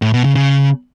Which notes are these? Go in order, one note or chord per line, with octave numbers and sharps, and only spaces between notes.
A2
B2
C#3
C#3